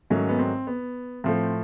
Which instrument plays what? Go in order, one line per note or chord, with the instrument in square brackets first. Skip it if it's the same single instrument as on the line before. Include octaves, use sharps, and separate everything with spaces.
[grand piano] G#2 D#3 F#3 A3 C#4
B3
C4
B3
A2 F3 A3 C4